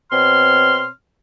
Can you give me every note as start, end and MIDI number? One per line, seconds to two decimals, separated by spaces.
0.11 0.87 47
0.11 0.87 60
0.11 0.87 73
0.11 0.87 84
0.11 0.87 89